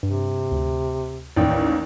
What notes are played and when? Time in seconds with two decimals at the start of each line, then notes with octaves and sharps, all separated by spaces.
0.03 G2 C3
0.51 D2
1.36 A1 D#2 D5 G5